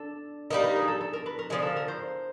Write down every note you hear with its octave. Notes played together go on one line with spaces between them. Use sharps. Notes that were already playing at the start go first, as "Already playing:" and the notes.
Already playing: D4 A4
G3 A#3 D#4 A#4
B4
A#4
G#4
A4
A4
A#4
B4
A#4
D3 F3 G#3 G#4
A4
A#4
C5